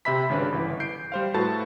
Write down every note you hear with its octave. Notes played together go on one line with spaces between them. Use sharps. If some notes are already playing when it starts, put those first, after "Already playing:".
C3 C5 E5 B5 B6
G#1 C#3 D4 B4
G1 E3
G6 C7 D7
G3 C5 F5
A2 F#4 A4 B4 A5 A6